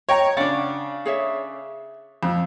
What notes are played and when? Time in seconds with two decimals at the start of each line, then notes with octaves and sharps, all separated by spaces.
0.09 C#5 D#5 G5 A#5
0.37 C#3 D4 C#5 D5 F#5
1.06 G#4 C#5 E5
2.23 F2